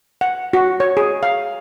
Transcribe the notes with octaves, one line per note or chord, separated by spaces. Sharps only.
F#5
F#4
C#5
G#4
F5